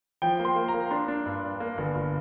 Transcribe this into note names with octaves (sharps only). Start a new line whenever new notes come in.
F3 G5
A#3
C6
A#3
A#5
A#3
D4 C6
D4
G2
G2
A#3
G1
G1